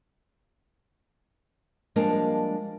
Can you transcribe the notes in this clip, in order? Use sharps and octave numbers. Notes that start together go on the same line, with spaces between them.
F3 G3 G#3 A#3 D4 A#4